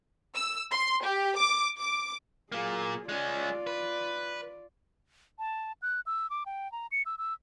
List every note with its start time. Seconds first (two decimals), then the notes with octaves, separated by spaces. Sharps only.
0.34 E6
0.71 C6
1.03 G4
1.36 D6
1.78 D6
2.52 A#2 F#3 A#3 G#4
3.09 G#3 C#4 F4 D5
3.67 B4
5.39 A5
5.82 F#6
6.06 E6
6.30 D6
6.46 G5
6.72 A#5
6.92 C#7
7.06 E6
7.18 E6